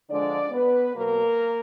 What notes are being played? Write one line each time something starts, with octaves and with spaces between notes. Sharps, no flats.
D3 F3 G#3 D4 D5
B3 B4
B2 F#3 A#3 A#4